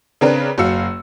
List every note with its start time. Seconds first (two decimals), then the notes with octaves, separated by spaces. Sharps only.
0.21 C#3 C4 D4 A#4 B4
0.58 F#1 F#3 F5 E6 C#7